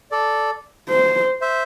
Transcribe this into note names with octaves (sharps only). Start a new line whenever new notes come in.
A4 D5
C5
C5 E5